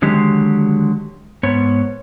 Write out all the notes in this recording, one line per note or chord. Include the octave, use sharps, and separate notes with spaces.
D3 D#3 F#3 G#3 G4
G#2 B3 C#5